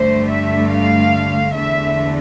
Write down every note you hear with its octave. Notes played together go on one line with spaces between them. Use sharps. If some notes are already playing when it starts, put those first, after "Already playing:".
Already playing: G2 D3 A3 C5
E5
F5
E2 D3 A3 E5